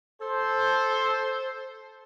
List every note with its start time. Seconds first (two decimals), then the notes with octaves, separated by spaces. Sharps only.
0.21 A4 C5